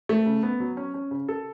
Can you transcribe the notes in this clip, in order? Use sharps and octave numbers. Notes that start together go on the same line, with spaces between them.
A3
C#3
B3
F#3
C#4
C#4
C#3
A4